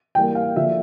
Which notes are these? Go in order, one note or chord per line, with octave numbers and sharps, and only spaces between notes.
E3 G3 A#3 G5
F5
D3 F3 A#3 E5